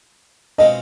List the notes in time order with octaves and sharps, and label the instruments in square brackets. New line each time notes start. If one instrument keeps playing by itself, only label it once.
[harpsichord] B2 G#3 C4 F4 [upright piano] D#5